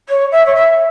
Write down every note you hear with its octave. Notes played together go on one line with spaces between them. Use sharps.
C#5
E5
C#5
E5